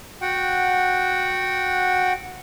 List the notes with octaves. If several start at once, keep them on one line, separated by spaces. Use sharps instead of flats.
F#4 F#5 G5